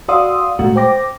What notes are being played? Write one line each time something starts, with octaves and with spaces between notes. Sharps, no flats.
F#4 D5 F5 C6 D#6 E6
A#2 G#3 A3 F#4
C5 G5 D6 A#6